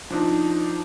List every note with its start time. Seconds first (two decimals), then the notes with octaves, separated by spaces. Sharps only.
0.10 F3 D4 D#4